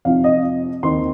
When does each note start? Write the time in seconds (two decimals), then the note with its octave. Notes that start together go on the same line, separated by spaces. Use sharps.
0.05 F2 C3 F3 D#4 F5
0.24 D#5
0.83 D#2 D#3 C4 D#4 C6